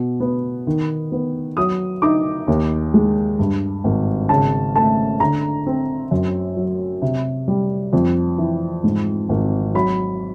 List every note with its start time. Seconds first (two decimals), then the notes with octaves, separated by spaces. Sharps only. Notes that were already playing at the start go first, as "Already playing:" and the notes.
Already playing: B2
0.20 B3
0.67 D#3
1.12 B3
1.57 F#3 D#6
2.02 D#4 D6
2.47 D#2
2.94 G#3
3.39 G2
3.84 G#1
4.29 C#3 A5
4.75 A3 A5
5.20 D3 A#5
5.67 C4
6.11 F#2
6.57 F#3
7.02 C3
7.48 G3
7.93 F2
8.38 E3
8.84 G#2
9.29 G#1
9.74 F#3 B5